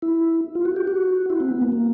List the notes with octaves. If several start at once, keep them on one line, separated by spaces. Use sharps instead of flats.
E4
F4
F#4
G4
F#4
E4
C4
B3
A#3
A#3